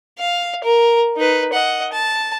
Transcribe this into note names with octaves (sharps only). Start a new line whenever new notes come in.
F5
A#4
D#4 B4
D#5 F#5
A5